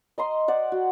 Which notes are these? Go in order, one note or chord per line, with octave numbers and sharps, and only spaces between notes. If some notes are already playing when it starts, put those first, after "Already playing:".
D#5 A#5 C6
C5 D5 F#5
F#4